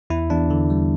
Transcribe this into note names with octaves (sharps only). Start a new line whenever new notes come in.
E2 E4
E2 D4
D3
G3